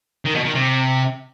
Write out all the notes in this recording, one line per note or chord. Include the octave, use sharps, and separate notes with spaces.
D#3
B2
D#3
C3